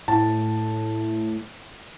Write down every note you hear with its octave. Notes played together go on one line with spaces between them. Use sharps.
A2 A5